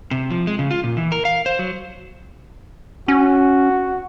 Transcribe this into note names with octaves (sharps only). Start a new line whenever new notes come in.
C3
F3
G#3
C#3
F4
A#2
E3
A#4
F5
C5
F#3
C#4 F#4